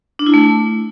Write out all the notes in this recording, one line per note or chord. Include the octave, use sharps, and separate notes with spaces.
D4
E4
A3